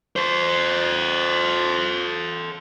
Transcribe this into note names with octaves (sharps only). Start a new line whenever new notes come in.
A4 C5